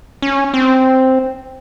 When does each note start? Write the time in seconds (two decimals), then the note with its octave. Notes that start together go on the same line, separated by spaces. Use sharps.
0.22 C#4
0.54 C4